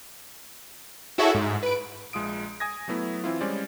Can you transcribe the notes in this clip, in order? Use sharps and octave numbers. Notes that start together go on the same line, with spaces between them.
E4 F#4 G#4 A4 C#5 E5
G#2
B4 D7
A#1 G#3 F4 D#6 D7
G#5 D#6 G#6 A#6
F#3 A3 B3 E4
E3 C4 E4 F4
G3 G#3 C#4 C5 D5